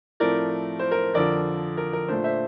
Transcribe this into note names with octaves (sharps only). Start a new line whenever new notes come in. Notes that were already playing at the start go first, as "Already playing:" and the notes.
A2 F3 A3 C4 A#4 D5
C5
A#4
F2 D3 F3 A#4 D5
A#4
A#4
A#2 A3 D4 C5
C5 E5